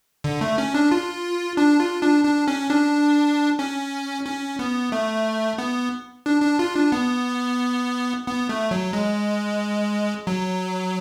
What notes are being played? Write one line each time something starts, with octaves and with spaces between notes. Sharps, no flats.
D3
A3
C#4
D4
F4
D4
F4
D4
D4
C#4
D4
C#4
C#4
B3
A3
B3
D4
D4
F4
D4
B3
B3
A3
F#3
G#3
F#3